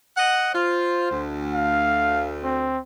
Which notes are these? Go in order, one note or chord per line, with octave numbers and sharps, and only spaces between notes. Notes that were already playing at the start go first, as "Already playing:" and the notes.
D#5 F#5
F4 C5
D2
F5
C4